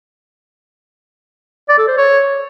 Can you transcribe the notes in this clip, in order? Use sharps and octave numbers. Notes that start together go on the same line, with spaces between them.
D5
A4
C5
C#5